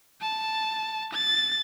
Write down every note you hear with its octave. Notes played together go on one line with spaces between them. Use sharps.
A5
A6